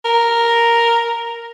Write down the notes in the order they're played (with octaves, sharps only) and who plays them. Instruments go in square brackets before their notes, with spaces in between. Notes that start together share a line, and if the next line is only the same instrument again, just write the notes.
[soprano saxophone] A#4